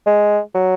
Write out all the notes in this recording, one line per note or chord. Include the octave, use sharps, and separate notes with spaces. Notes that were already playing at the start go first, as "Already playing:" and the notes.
G#3
F#3